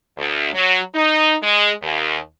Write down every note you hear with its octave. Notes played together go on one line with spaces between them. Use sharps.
D2
F#3
D#4
G#3
D#2